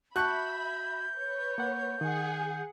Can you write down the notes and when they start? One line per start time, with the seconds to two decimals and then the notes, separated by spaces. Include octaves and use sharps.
0.16 F#4 E5 A5 B5 C#6 F#6 G6
1.16 B4 C#5
1.58 A#3 F#5
2.01 D#3 G#4 F#5